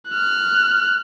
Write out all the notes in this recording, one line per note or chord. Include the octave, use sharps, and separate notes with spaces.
F6 F#6